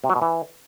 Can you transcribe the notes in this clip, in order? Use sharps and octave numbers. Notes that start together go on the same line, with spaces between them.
C3
F#3
B2
E3